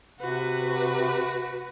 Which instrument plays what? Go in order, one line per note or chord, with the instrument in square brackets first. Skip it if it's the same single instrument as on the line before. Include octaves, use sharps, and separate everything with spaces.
[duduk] C3 [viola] F#4 B4